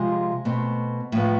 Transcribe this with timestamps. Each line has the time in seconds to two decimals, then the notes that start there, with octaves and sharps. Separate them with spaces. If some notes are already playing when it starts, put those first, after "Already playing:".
Already playing: C3 F3 G#3
0.45 B2 A3 C4
1.12 A2 F3 B3